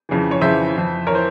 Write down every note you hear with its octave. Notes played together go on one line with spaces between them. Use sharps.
F2 C#3 E3
C#5
F2 C#3 E3 C5 E5
F2 E3
A#4 C#5
E3 C5